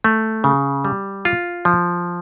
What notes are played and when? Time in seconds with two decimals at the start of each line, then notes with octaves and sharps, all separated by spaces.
0.04 A3
0.44 C#3
0.85 G3
1.25 F4
1.65 F3